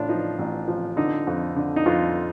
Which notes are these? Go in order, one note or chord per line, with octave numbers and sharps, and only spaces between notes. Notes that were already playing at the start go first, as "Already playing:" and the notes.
Already playing: A1 A2 D4 F4
F3 D#4
A1
F3
D3 D#4
F2
D3
D#4
F2 F4